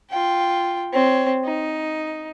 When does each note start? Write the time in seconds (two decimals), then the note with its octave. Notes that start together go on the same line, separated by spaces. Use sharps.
0.10 F4 G5
0.93 C4 C#5
1.44 D#4